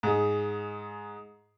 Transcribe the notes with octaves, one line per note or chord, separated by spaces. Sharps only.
G#2 G#4